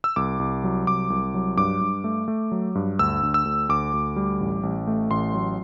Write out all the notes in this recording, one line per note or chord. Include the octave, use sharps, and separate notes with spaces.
E6
C2 D6
C2
F#3
C2 D6
C2
F#3
G2 D6
G2
A3
A3
F#3
G2
D2 E6
D2
E6
D2
D2 D6
D2
G3
A1
A1
A3
A1 C6
F#3